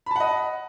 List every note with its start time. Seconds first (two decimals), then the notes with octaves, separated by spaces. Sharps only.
0.06 B5
0.11 A5
0.16 F#5
0.20 D#5